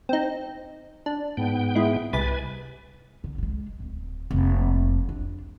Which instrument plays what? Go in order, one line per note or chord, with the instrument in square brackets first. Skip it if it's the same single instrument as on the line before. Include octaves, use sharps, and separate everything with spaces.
[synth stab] C4 D#4
D4
[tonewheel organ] G#2 B3 G5
[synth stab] G#3 E4
[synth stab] C2 B5 A6 [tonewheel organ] B4 G#5
[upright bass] D3
F#3 G#3
D1
F1 A#3
D4